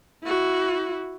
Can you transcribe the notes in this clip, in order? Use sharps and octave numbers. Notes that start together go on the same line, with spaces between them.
E4 F#4